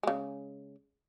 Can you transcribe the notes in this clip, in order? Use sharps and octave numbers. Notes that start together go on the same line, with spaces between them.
C#3 G#3